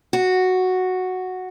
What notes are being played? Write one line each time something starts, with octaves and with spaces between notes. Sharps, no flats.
F#4